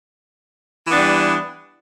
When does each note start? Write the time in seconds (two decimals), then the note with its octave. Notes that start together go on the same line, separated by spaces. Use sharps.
0.86 E3
0.89 B3
0.92 D4
0.95 G3